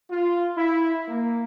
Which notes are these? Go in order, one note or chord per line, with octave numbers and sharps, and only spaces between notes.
F4
E4
A#3